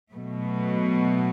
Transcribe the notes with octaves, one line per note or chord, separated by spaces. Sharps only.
B2 F#3 A3